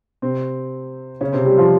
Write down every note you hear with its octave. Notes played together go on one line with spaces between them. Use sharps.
C3 C4
C#3 C#4
C3 C4
G3 G4
F3 F4